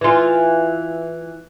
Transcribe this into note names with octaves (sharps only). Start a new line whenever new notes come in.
E3 F4